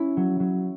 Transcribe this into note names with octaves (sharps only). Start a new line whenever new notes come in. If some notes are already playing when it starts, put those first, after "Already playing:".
Already playing: C#4 E4
F#3
F#3